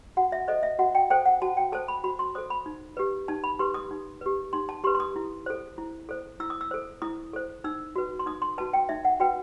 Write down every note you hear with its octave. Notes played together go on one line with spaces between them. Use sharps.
F#4 F#5
E5
A4 C5 D#5
E5
F#4 F#5
G5
A4 C5 G5
F#5
F#4 A5
G5
A4 C5 A5
B5
F#4 B5
C6
A4 C5 D#6
B5
D#4
G4 B4
D#4 A5
B5
G4 B4 C6
D#6
D#4
G4 B4
D#4 C6
A5
G4 B4 C6
C6
D#6
E4
A4 C5
E4
A4 C5
E4 E6
D#6
E6
A4 C5
E4 D#6
A4 C5
D#4 E6
F#4 B4
C6
D#4 D#6
C6
F#4 B4 A5
G5
D#4 E5
F#5
F#4 B4 G5